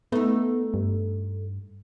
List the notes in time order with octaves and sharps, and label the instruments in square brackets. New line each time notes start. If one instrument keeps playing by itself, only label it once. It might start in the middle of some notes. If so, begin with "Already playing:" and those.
[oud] A3 D#4 [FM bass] B3
[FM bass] G2